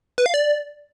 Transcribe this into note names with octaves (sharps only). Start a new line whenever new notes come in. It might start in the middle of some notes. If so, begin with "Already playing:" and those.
B4
F5
D5